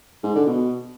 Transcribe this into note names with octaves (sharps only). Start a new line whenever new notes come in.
G#2
D3
B2